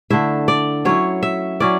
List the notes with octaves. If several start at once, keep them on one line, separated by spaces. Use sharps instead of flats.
D3 A3 E4 E5
D5
F#3 C#4 E4 C#5
E5
F#3 C#4 E4 D5